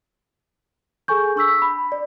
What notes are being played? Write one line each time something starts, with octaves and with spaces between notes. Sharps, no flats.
G#4 A4 G#5 C#6 G6
D4 C#6 E6 B6
B5
D5